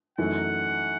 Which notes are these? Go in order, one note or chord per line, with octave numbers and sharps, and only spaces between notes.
F#2 E3 A3 D#4 F#5